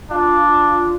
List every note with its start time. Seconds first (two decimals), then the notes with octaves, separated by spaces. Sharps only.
0.11 D4 F4